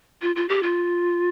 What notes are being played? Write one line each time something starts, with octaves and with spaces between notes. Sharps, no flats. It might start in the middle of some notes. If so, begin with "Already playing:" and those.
F4
F4
G4
F4